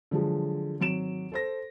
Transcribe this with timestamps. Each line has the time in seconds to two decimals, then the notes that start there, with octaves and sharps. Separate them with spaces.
0.11 D3 F3 F#3 G#3
0.80 G#1 F#3 D7 E7
1.32 A4 C5 A#6